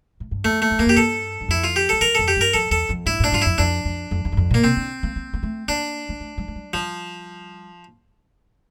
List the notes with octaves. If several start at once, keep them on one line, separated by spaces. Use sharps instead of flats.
A2
G2
F2 A3
A3
F2
E2 A#3
F2 G4
G2 A4
G2
F2 E4
F4
G4
E2 A4
F2 A#4
F2 A4
G4
G2 A#4
F2 A4
E2 A4
F2
G2 E4
A2 D4
G2 F4
F2 E4
F2 D4
F2
F2
E2
G2
F2
A#2 A#3
C3 C4
D3
A#3
A#3
A#3
A3
A#3 D4
A#3
A3
G3
A3
G3
F3 G3